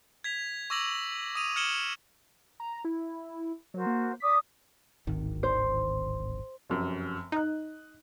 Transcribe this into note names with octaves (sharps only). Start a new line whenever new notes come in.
G#6 B6 F7
C#6 D6 E6 A#6 F7 F#7
D#6 D#7 F7
F6 G#6 C#7 E7 F#7 G7
A#5
E4
F#3 F#4 A#4 C5
A#3
D5 D6 D#6 B6
D1 G#1 D#3
C5
F1 F#2
D#4 D#5 F#6